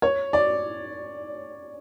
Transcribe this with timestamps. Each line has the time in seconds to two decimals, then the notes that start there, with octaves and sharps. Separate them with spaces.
0.02 C#5
0.33 D5